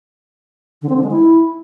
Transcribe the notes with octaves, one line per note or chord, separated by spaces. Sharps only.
D3
C4
D3
G#3
E4